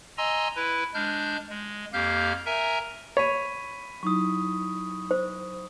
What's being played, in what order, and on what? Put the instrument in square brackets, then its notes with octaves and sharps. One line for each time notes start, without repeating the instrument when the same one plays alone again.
[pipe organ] D#5 G#5 A#5 C6 E6
E4 B4
G#3 D4 F6 G6
G#3
F2 A#3 G4 F5 F6 G6
A#4 E5 G#5 A#5
[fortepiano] C#5 [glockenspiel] B5 B6 D#7
[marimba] F#3 D#4 E4 [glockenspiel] C#6 D#6
[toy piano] C5